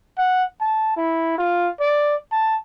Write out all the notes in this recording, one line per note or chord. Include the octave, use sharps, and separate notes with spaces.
F#5
A5
E4
F4
D5
A5